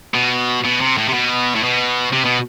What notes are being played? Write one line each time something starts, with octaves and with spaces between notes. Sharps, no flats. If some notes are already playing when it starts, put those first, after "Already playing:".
B2
B2
C3
A2
C3
B2
A2
B2
C3
B2